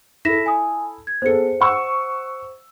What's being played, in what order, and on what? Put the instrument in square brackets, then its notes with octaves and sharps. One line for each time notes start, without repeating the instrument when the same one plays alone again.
[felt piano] E4 A4 [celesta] A#6 B6 E7
[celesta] G#5 D#6
G#6
[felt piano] B3 G#4 A4 [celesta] C5 C#7
[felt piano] F#5 C#6 E6